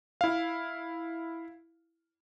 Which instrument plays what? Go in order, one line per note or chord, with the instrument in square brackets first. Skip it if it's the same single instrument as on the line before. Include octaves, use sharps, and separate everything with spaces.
[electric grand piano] E4 F5